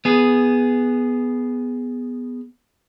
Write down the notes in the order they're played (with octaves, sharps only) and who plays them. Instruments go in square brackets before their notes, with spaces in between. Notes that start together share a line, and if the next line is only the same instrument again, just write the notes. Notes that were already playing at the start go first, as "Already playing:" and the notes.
[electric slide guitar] B3 G#4